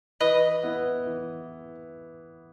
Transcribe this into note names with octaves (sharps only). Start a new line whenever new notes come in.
E3 B4 D#5
B3 E4
E3